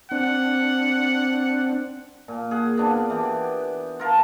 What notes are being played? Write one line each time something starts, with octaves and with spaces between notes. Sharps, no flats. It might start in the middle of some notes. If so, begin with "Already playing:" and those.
C4 D4 F#5
A#2
G#4 F#5
B3 D4 F5
E3 G4
F4 A#4 A5